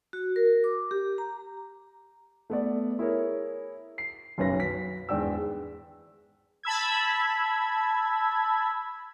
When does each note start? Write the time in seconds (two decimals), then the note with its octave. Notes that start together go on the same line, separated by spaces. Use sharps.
0.13 F#4
0.36 A#4
0.64 D6
0.91 G4
1.18 A#5
2.50 A3 B3 D5
2.99 E4 G#4 A#4 C#5
3.98 C7
4.38 F#1 B1 C#4 B4 A#6
4.60 F#3 B6
5.09 E2 G#2 D4 G5 E6
6.63 A5 B5 E6 G#6